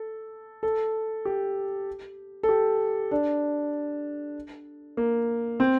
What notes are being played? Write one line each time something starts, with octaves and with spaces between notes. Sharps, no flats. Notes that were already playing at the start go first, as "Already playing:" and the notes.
Already playing: A4
A4
G4
A4
G4
D4
A#3
C4